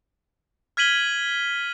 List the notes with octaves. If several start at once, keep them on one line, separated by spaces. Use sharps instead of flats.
F6 G#6 B6 D#7 F#7 G7